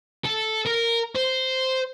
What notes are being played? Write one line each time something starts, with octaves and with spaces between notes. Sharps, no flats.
A4
A#4
C5